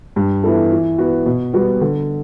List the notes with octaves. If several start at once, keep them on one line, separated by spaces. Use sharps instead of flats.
G2
E3 B3 E4 A4
E3
B3 F#4
B2
G3 B3 F#4
D3